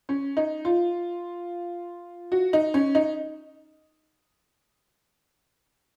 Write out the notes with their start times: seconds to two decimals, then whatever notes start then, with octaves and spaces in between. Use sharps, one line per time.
0.09 C#4
0.37 D#4
0.65 F4
2.32 F#4
2.53 D#4
2.74 C#4
2.95 D#4